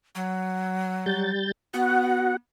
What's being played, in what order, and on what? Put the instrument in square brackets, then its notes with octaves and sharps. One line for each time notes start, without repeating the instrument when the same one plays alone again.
[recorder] F#3
[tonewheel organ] G3 G6 A6
[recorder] B3 [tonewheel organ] F#4 F#5